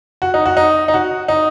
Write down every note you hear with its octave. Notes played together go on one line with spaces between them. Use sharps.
F#4
D#4
F#4
D#4
D#4
F#4
D#4